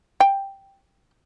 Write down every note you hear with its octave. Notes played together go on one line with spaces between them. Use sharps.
G5